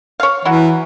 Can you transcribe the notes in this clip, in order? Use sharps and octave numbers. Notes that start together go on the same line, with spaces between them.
C#5 F5
E3 F#3 E4